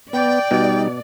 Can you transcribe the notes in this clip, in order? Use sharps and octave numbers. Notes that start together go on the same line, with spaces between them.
B3 D5 G5
B2 G3 D#4